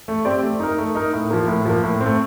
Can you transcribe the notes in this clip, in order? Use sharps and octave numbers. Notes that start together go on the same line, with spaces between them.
A3
C4 G4 D5
A3
D#4 A#4
A3
D#4 A#4
A2
F3 A#3
A2
F3 A#3
A2
C4
A3